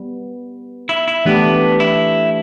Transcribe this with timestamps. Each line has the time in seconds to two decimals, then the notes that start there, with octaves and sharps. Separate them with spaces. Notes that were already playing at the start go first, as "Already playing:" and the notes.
Already playing: G3 B3
0.89 E4
1.08 E4
1.25 E3 A3 B3 D4 G4
1.80 E4